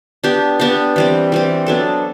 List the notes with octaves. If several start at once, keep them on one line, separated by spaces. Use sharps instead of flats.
B3 D4 G4
B3 D4 G4
E3 G3 C4
E3 G3 C4
F#3 B3 D4 A4